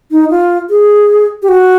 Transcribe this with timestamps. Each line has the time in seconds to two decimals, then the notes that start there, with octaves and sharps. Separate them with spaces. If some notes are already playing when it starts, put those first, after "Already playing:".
0.11 D#4
0.30 F4
0.70 G#4
1.43 G4
1.49 F#4